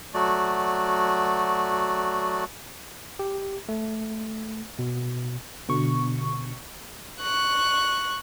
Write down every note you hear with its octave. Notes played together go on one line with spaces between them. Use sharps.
F#3 A3 F#4 D5
G4
A3
B2
B2 D3 C#6
C#6 F#6